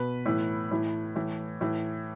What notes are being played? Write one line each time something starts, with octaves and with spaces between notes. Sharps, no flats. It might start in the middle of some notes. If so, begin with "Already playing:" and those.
Already playing: B2 B4
A2 E3
A2 E3
A2 E3
A2 E3